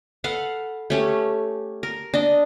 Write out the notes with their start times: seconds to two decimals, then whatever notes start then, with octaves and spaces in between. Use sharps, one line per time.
0.24 A4 B4 F5 F#5
0.90 A3 C#4 G4
1.83 A#4
2.14 D4 D#5